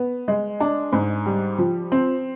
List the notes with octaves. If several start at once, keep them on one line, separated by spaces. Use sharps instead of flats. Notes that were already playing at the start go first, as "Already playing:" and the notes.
Already playing: B3
G#3
D4
G#2
G3
F3
C4